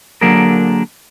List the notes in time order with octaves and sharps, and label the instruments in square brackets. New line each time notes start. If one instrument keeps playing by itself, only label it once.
[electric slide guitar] D3 F#3 A#3 D4 G#4 A#4